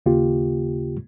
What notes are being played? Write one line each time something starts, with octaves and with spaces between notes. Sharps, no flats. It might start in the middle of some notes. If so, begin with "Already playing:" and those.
D#2 C#3 A#3 F4 G4